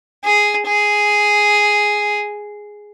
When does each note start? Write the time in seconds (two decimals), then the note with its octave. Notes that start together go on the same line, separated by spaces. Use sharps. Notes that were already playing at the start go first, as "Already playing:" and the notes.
0.25 G#4
0.67 G#4